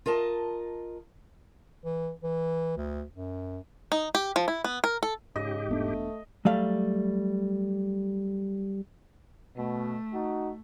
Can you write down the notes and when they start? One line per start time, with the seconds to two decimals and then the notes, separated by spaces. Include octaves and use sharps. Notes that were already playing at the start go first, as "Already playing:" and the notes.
0.06 F4 A#4 D#5 A5
1.85 E3
2.24 E3
2.77 D2
3.15 F#2
3.92 D#4
4.15 G4
4.36 F3
4.48 E4
4.64 B3
4.84 A#4
5.03 A4
5.36 G#2 C#3 G4 D#5
5.69 E1 A3 B3 D4
6.45 F#3 G3 A3 F5
9.56 B2 A3
10.13 D#4 F#4